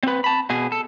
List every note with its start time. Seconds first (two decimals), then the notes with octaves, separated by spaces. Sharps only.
0.03 C4 B4
0.24 A5 B5
0.50 B2 G#4
0.72 A4